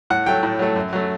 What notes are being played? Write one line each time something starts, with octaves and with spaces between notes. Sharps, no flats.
A2 F#5
F#3 A3 G5
A2
F#3 A3
F#2
F#3 A3